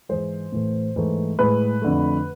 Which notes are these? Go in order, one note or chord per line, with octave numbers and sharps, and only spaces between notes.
G#2 E3 G#3 C5
A2 E3 A3
G#2 E3 A3
A2 G#3 B4
F2 D3 A3